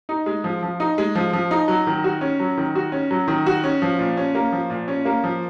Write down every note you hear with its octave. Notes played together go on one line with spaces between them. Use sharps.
D#4
G#3
F3
F3
D#4
G#3
F3
F3
D#4
F#3
D#3
F#4
C#4
F#3
D#3
F#4
C#4
F#3
D#3
F#4
C#4
F3
A#2
C#4
A#3
F3
A#2
C#4
A#3
F3